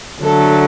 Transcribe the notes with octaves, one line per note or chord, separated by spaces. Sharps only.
D3 F#3 A3 A4